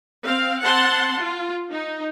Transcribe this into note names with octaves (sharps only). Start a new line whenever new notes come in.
C4 F5
C4 F#5 A5 C6
F4
D#4